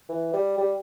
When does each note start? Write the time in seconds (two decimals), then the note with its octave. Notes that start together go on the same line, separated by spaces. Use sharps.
0.09 E3
0.33 G3
0.57 G3